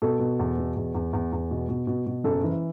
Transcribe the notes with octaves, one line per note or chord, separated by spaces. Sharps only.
B2 A4
B2
E2
B2
E2
E2
E2
E2
B2
B2
B2
B2
F#1 A4
E3